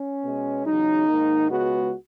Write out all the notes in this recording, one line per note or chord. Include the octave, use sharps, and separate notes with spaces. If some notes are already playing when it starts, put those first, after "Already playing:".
Already playing: C#4
B2 G#3 B3
E2 C#3 F#3 D#4
G#2 D#3 A#3
C#2 C#3 G#3 B3 F#4